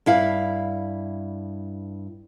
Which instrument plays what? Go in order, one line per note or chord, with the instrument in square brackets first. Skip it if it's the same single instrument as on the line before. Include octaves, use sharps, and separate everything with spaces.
[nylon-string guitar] G2 E4 F5